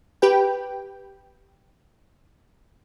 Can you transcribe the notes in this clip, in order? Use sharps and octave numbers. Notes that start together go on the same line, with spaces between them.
G4 B4 G5